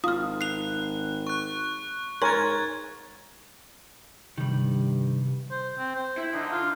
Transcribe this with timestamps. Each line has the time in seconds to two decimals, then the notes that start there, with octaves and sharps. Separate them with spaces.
0.04 G#1 F4 D#6 F6
0.41 F#6 C7 F7
1.27 C#6 F#6
2.22 G#2 A#4 C#5 G#5 C6 G#6 A6
4.38 G2 C3 D#3 G3
5.51 C5
5.79 C4
5.96 C5
6.18 E4
6.34 D3 D#4
6.52 F4